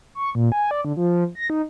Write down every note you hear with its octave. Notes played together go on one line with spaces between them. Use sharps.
C#6
A#2
G#5
D5
D3
F3
A#6
D#4